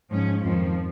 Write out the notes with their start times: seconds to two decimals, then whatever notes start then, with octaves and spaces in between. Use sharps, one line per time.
0.12 G#2 F3 C#4
0.43 F2 D#3 F3